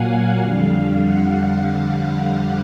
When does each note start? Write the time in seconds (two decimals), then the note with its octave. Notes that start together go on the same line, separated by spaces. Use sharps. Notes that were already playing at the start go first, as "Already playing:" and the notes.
Already playing: A#2 F#3 A#3 F5 F#5 G#5
0.39 F2 D3 G3 F5
1.01 F#5